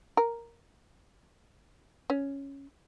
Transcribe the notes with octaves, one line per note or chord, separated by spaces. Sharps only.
A#4
C#4